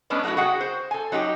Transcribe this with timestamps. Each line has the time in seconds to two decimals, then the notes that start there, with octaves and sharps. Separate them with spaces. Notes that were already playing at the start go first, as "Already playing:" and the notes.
0.10 G#3 B3 C#4 D4 B4
0.23 F#3 A3 A#3 E4 F#4
0.37 F#4 G#4 F#5 G5
0.61 C5
0.91 A4 G#5
1.12 F#3 D#4 F4 G4